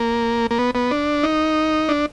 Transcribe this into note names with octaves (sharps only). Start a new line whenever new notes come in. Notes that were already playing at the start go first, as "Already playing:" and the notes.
Already playing: A#3
A#3
B3
B3
D4
D#4
D4